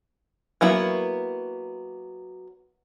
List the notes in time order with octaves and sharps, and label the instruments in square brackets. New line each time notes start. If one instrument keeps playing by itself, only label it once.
[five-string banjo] F#3 A#3 B3 E4